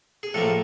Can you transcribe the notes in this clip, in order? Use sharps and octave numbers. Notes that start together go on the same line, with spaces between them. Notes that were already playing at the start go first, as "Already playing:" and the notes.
G#4
A2 F3 A#3 A4